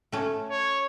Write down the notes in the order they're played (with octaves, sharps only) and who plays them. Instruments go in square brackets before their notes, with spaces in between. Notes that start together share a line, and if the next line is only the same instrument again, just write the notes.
[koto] A3 C#4
[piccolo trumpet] C#5